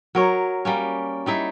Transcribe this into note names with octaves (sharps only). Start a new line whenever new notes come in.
F#3 A#4 C#5
G3 A#3 C#4
G3 D#4 E4